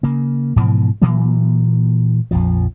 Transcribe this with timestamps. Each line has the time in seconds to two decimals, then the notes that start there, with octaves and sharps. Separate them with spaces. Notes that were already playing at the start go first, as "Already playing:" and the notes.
0.03 C#3 A#3
0.56 G#2 B2 E3 F3
1.02 A#2 E3 F#3 A#3
2.31 A#1 F2 F3